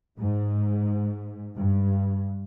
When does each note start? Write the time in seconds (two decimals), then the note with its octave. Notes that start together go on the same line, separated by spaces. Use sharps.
0.18 G#2
1.56 G2